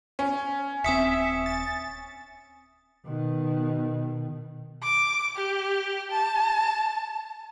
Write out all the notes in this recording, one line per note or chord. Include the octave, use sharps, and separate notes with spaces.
C#4
D#1 C4 E5 G#5 D#6 C#7
A6
B2 D#3
D6
G4
A5